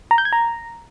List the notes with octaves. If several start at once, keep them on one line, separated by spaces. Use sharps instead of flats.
A#5
G6
G#6
A#5